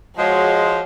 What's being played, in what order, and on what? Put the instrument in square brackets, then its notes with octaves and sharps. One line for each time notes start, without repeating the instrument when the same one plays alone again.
[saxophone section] F3 G#3 [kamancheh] F#4 C#5